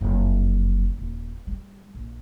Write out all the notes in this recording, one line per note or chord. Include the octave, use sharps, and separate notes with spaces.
F#1 F2
D#1
G3
A#1